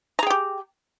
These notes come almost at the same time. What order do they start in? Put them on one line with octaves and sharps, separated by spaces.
A#5 G#4 G5 G4